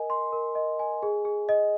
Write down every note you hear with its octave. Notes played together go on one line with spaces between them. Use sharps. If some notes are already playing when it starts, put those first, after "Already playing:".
Already playing: A#4 D#5 G#5
C6
A#4
D#5
G#5
G#4
G#4
D#5